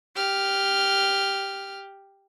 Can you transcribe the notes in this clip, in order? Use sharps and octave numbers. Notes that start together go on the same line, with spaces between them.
G4 F6